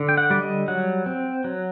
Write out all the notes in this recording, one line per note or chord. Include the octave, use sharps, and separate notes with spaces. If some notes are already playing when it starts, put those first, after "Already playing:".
Already playing: D3
G5
F#5
G3 D5
D#5
F#3 F#5
C4
F#3